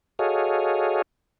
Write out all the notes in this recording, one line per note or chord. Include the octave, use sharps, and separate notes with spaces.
F#4 G#4 A4 C#5 D#5 F5